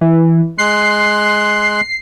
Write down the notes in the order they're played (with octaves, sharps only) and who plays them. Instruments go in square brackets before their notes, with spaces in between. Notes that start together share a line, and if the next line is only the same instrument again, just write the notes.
[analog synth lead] E3
[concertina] G#3 C6 F#6 [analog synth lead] C7